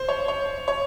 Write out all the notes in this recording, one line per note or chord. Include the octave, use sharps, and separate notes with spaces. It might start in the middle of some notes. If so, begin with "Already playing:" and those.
Already playing: C5
C#5
C#5
C#5